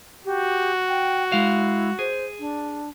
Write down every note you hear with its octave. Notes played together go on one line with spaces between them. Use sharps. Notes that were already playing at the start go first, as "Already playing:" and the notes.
F#4 G4
G5
G#3 E4 F5
G#4 C5
D4